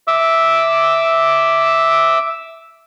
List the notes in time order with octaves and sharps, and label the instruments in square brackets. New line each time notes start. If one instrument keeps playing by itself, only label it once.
[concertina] E5 D6 E6